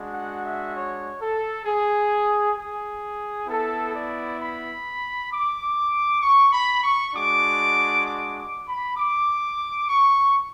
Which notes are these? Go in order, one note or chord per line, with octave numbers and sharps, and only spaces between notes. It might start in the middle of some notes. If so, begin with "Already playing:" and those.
Already playing: G#3 D4 F#4
F#5
E5
C#5
A4
G#4
G#4
B3 E4 A4
D5
B5
D6
C#6
B5
C#6
G#3 D4 F#4 D6
D6
D6
B5
D6
C#6